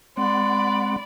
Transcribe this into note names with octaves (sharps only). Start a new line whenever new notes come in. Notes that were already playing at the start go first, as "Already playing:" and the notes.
G#3 C4 D5 F#5 B5 C6